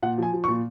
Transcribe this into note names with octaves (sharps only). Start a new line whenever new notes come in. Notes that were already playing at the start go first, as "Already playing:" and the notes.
A#2 F#5
F3 G#5
F3
C#6
A#2